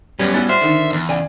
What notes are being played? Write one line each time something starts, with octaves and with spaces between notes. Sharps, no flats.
F#2 G3 B3 C#4 G#6
A2 F#3 G3 B3 G#5 A6
C5 E5 F6
D3 D#3
E2
C#3 D5 G#5